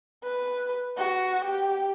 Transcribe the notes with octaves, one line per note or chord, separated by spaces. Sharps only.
B4
F#4
G4